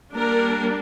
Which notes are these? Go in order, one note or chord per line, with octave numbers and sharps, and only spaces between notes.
G3 A#3 D4 A#4